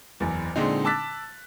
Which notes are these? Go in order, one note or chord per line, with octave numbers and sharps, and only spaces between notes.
F#1 E2
A#2 D3 G#3 C4 D#4
A5 D6 E6 F#6 A6 B6